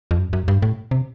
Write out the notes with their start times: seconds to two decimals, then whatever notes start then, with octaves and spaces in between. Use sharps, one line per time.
0.11 F2
0.19 F#2
0.33 F#2
0.48 G2
0.62 A2
0.91 C3